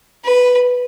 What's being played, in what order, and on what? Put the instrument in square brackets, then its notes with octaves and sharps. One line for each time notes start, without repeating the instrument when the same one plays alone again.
[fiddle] B4